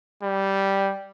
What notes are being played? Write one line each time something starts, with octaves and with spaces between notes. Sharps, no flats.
G3